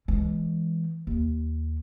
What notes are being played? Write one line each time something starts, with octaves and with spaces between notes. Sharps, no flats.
E3 G#3
D#2